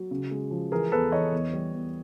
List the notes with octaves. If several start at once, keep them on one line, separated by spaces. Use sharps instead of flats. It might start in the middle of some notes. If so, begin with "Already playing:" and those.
Already playing: F#3
C#3
G#3
F3
E3 G#4 A#4
E2 A4 B4
E3 C#5 D#5
E2
G3
E2